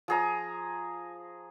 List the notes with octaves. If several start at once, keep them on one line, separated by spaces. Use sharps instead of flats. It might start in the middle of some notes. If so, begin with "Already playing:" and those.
F3 G#4 A#5